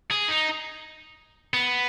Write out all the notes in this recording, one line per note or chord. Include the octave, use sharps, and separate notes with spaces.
G#4
D#4
B3